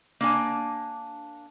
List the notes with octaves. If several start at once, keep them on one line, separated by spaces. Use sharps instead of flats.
A#3 D4 G#5